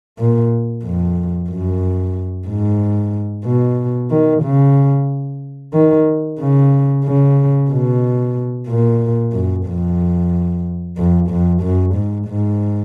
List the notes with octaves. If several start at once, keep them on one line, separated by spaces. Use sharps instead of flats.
A#2
F2
F#2
G#2
B2
D#3
C#3
D#3
C#3
C#3
B2
A#2
F#2
F2
F2
F2
F#2
G#2
G#2